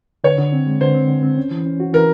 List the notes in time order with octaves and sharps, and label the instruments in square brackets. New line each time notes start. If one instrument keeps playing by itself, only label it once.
[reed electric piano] D3 [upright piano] C#5
[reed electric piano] D3
C4
G#3
[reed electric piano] D3 [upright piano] C5
[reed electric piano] C4
D3
C4
C#4
E3
C#4
F#4
[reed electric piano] E3 [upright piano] A#4